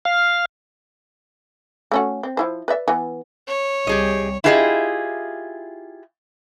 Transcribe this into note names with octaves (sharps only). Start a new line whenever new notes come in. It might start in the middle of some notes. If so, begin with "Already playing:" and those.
F5
A3 C#4 F#4
C4
F3 E4 C5
B4 D5 E5
E3 B3
C#5
C2 G4 G#4 D#5
E4 F4 G4 G#4 C5 D#5